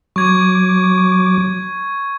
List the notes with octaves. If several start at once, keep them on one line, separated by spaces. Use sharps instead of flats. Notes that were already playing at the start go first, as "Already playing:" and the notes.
F#3 C#6 D6 G#6